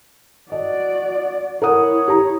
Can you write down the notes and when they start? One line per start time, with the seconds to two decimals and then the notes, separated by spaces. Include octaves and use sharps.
0.52 F#4 D5 D#5
1.62 E4 A#4 C#5 F#5 D#6
2.08 G4 A#5